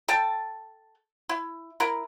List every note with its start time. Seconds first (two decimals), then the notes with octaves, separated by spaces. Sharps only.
0.08 A4 G5 A5
1.29 E4
1.80 E4 A#4